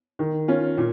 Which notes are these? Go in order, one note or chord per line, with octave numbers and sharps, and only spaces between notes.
D#3
C#4 F4
A#2